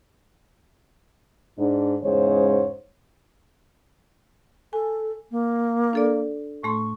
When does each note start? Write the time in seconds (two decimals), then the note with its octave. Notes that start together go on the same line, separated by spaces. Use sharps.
1.59 G#2 D4
2.03 E2 G#2 C#3 G#3 C5 C#5
4.73 A4 G#5
5.31 A#3
5.93 D4 A4 D5
6.63 A2 A3 C6 C#6